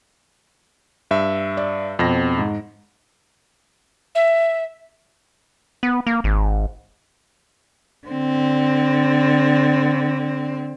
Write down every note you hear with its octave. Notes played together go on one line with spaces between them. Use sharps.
G2 E5
D5
F2 B2 C4 A#6
G#2
E5
B3
A#3
G#1
D3 C4